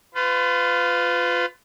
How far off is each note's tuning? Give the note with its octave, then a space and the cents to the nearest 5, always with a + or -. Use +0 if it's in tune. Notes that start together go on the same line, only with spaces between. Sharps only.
F4 +5 B4 +35